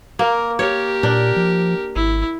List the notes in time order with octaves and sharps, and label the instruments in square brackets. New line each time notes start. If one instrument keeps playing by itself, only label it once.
[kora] A#3 [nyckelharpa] A#4
[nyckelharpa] G4 A#4 [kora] C#5
[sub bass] A#2 [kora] D4
[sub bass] F3
[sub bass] G#1 [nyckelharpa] E4